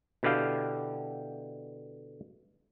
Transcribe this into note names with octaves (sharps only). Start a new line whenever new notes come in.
B2 D3 E4 G4 F5 G5